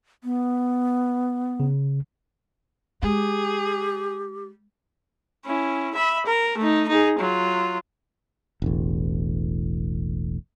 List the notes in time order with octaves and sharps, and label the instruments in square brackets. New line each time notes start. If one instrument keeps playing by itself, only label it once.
[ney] B3
[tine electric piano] C#3
[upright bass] G#3 [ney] G4 [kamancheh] G#4
[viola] C#4 E4
E5 B5
A#4
A3 D#4
D#4 G#4
F#3 F4
[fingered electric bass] E1 A1